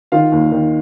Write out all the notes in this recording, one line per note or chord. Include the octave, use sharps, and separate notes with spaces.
D#3 F4 F5
D#2
D#3